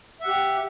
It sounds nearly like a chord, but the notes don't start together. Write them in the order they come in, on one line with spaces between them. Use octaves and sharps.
E5 F#5 G4